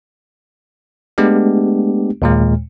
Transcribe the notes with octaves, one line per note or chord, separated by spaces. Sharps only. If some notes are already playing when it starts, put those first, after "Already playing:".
G#3 A3 B3 D4 G4
D#2 A#2 G#3